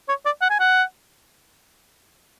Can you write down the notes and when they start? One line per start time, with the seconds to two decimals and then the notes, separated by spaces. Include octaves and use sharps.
0.09 C#5
0.25 D5
0.41 F#5
0.50 G#5
0.60 F#5